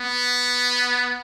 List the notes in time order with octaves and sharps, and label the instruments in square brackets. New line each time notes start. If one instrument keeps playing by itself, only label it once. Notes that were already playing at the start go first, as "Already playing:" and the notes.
Already playing: [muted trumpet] B3